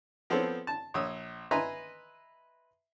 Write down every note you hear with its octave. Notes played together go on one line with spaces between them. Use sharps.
F3 B3 C4 A4 C#5
A5
A#1 C#5 D#6 E6
B4 D#5 E5 G#5 A#5 C6